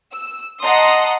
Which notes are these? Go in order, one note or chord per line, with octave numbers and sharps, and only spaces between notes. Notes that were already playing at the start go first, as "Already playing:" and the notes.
E6
D#5 F#5 A5 A#5 C6 D#6